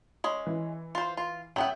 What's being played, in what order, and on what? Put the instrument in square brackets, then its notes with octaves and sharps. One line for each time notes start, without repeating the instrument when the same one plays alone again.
[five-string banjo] G#3 C#4
[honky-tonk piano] E3
[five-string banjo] F4 C5
F4
[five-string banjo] F#3 B3 F#5 [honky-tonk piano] E5 G5